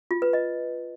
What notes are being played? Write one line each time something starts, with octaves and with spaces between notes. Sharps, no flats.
F4
B4
D#5